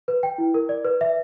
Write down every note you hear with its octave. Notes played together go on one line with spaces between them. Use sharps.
B4
G5
E4
A#4
D5
B4
E5